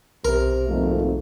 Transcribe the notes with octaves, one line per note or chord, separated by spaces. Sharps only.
B1 C3 A#4
G#1 F2 A3 A#3